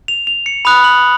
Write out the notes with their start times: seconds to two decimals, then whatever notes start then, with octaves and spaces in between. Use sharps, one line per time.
0.08 F7
0.27 F7
0.46 C#7
0.65 B5 D#6 F#6 F7
0.84 F#7